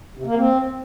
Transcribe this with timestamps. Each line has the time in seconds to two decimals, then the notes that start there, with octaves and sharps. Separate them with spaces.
0.17 C3
0.27 A#3
0.36 C4